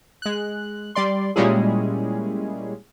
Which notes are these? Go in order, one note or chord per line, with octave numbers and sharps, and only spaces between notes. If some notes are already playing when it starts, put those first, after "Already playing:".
G#3 F#6
G3 D5 C6
A#2 G3 G#3 C#4 E4 G#4